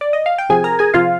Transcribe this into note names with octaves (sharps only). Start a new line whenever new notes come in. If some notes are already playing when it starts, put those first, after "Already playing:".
D5
D#5
F5
G5
C3 F3 G#4 G#5
A#4 A#5
G#4 G#5
C3 F3 F4 F5